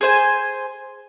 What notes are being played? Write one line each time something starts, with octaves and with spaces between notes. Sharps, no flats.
G#4 C5 G#5